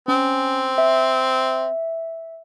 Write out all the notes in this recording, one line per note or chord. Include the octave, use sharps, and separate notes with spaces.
C4 C#4
E5